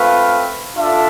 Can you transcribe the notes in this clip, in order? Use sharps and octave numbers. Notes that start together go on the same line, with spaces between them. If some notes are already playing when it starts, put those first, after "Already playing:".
Already playing: A3 C4 F4 B4 F5
D4 F4 A4 E5